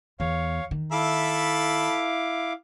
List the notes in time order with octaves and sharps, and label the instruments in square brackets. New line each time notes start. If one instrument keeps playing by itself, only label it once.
[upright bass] E2 [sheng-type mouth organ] C#5 F5
[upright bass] D#3
[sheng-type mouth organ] E4 F5 D6 [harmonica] A4 E5 B5